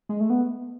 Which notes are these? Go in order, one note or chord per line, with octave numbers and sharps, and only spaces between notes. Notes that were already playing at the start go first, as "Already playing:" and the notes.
G#3
A3
B3